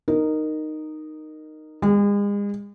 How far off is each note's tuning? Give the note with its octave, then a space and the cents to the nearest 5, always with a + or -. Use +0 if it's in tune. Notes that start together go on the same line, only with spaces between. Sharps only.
D#4 -10 A#4 -5
G#3 -40 G#4 -15